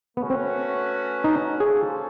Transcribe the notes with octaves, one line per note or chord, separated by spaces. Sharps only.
A3 B3 C#4 F#4 B4
C4
D#4
A#3 C#4 F4 G#4 A4 C5